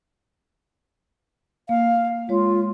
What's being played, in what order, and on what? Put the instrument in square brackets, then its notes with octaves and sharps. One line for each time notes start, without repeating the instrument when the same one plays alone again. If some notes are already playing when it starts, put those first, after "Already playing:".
[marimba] A#3 [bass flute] F5
[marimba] G#3 C#5 [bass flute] F4